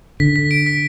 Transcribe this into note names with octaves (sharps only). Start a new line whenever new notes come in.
D3 B6
B6
D7
B6